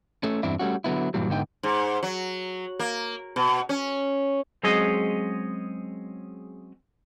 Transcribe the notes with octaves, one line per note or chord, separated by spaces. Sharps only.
A3 C#4
E2 G2 C4 D4 E4
G3 A3 C#4 F#4
D3 F#3 B3 E4
G2 A#2 E3 F#3 G3
G#2 D3 B3 D#4 G5
G#2
F#3
A#3
B2
C#4
F#3 G#3 C4 C#4 G#4 D#5